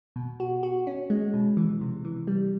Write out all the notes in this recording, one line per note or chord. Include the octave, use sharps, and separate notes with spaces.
B2
F#4
F#4
C#4
G#3
B2
E3
C3
E3
G3